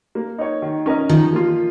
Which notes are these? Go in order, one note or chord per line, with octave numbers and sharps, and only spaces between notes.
A#3
D#4 C#5
D#3
C#4 A#4 D#5
D#3 F3
A#3 F4